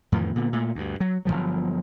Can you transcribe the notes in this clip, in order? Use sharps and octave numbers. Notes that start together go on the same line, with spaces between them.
F2 A2 D#3 E3
A#2 D3 B3
A#2 A3
D2 G2
F#3
G1 E2 F3 F#3